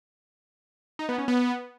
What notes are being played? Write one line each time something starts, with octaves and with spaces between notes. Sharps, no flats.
D#4
B3
C#4
B3